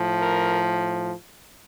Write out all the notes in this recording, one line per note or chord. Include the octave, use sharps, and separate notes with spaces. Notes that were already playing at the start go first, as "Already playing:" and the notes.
Already playing: A2 F3
A#4